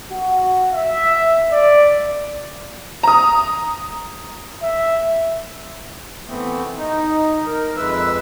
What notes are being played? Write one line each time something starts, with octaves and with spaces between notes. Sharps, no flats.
F#4
E5
D5
A#5 D#6
E5
E3 A3 B3 C4
D#4
A#4
F2 G#3 B4 E5 E6